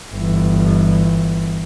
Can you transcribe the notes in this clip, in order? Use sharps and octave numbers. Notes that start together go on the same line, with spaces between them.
G1 E3